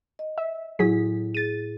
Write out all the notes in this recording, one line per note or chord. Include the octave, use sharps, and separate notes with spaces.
D#5
E5
A2 F#3 E4 G#4 B6
G#4 A6 D#7